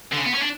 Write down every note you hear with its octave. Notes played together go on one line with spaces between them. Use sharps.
D3
C#3
B3
C#4
D4